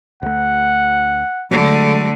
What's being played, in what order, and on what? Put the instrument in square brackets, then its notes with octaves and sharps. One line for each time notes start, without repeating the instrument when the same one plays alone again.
[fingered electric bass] D2 A3 [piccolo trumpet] F#5
[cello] D3 A3 [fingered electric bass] F#3 G#3